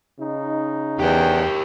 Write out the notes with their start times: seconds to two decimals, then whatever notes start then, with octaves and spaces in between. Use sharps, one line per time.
0.19 C#3 D#4
1.00 E2 G4 A#4 G5